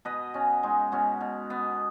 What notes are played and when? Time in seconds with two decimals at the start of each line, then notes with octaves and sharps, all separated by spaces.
0.05 B2 B4 D#5
0.34 B2 C#4
0.63 G#3 D#4
0.92 B2 C#4 F#4
1.21 B2
1.50 B3